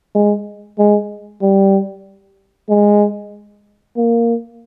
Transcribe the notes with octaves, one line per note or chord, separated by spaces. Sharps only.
G#3
G#3
G3
G#3
A#3